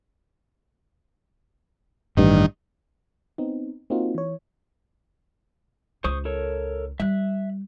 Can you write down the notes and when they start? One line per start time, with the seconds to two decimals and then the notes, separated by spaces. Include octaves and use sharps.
2.17 A1 G2 D#3
3.38 B3 C4 D#4
3.90 A#3 C4 D#4 F4 F#4
4.15 E3 C#5
6.04 C#2 F4 C5 C#6 D#6
6.25 A4 A#4 C#5
7.00 G3 E5 F#6